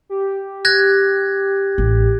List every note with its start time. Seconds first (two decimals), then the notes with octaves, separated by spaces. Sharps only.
0.10 G4
0.65 F#6 G#6 A#6
1.78 A1